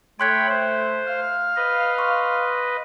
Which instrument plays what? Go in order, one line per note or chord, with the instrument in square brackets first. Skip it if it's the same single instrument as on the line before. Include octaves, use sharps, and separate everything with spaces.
[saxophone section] A3 [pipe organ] C#5 G5 B5 [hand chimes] C6 F#6 G#6
[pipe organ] C5
[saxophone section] F5
[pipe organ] B4 D#5
[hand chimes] C6 C#6